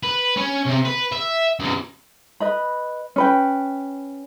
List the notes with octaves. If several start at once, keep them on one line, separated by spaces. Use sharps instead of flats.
B4
C#4
C3
B4
E5
F#2 B2
B4 D#5 B5
C#4 B4 G5